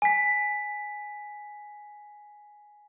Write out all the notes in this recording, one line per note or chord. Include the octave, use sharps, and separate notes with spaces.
G#5 B6